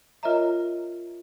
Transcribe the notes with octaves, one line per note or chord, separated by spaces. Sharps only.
F4 A#4 C#5 D#5 E5 A#5